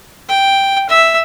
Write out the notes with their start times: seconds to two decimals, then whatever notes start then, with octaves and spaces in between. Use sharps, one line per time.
0.29 G5
0.89 E5